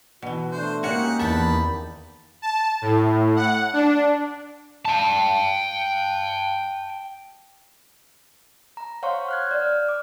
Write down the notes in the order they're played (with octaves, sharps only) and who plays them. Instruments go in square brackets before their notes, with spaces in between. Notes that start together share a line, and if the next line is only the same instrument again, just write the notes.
[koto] B2 E3 [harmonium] F#4
[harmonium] A3 D4 [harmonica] C5
[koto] G#3 C#4 F#4 [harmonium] A#3 D#4 G4 [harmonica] F#5
[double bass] E2 D#3 [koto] E5 F#5 G5 [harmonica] A5 B5
[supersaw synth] A5
A2
F#5
D4
[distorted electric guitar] G5 A5
[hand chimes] A#5
C5 C#5 F5 F#5 C6 C#6
F6 F#6 G#6
D5 G6
F6
D6